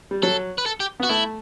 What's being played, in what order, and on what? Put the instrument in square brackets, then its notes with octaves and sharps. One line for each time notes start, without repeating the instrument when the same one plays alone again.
[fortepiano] G3
[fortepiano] F#3 [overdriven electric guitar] A4
[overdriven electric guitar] B4
A4
G4
[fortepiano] B3 [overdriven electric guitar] F#4
[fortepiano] A3 [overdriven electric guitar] E4